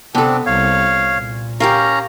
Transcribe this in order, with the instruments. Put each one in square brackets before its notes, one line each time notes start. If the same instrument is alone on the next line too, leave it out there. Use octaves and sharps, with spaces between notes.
[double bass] C3 [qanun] B3 A4 [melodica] C4 D4
[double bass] C2 [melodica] C#5 F5
[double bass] A#2
[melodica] C#4 A#5 [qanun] G4 A#4 F5